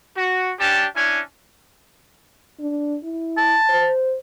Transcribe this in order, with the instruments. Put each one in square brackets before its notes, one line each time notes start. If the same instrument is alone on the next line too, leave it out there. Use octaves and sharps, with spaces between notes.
[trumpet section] F#4
C#4 D4 G4 A5
C#4 D4 E4 G#5
[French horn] D4
E4
[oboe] A5
[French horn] C5